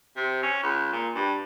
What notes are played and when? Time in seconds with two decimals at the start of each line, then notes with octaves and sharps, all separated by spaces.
0.17 C3
0.43 C#4
0.63 C#2
0.92 A#2
1.15 G2